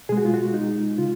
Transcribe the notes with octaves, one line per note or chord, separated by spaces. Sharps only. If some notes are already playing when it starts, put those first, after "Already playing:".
B2 G#3 G#4
F#4
F4
F#4
D#4
C#3 F4